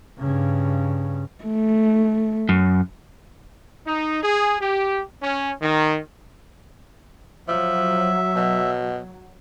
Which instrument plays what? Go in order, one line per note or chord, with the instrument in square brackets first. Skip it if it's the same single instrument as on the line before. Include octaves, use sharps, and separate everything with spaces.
[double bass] G2 C#3
[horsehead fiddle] A3
[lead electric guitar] F#2
[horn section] D#4
G#4
G4
C#4
D#3
[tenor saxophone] F3 [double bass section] F#3 [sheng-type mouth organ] E5
[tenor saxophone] B2